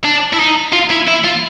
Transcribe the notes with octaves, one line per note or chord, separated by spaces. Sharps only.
D4
E4
D#4
F4
E4
E4
F4